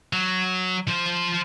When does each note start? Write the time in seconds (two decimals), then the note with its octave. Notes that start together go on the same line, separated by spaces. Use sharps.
0.13 F#3
0.88 F3 C5